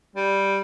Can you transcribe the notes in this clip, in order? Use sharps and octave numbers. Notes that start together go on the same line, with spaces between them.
G3